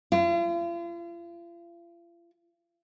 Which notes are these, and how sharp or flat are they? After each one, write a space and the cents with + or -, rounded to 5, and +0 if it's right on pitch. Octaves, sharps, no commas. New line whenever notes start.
F4 -40